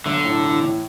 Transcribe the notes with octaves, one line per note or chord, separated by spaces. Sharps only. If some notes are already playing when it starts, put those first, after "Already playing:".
B1 D3
A2
E3
A2